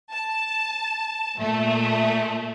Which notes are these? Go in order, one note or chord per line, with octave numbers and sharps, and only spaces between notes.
A5
A#2 A3